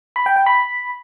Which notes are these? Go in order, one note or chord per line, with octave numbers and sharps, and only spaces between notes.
B5
G5
G5
B5